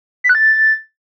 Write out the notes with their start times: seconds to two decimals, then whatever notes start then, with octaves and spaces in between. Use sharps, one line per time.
0.24 B6
0.29 F#6
0.35 A6